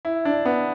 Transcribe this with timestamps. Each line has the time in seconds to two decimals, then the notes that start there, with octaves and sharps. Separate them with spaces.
0.05 E4
0.25 D4
0.45 B3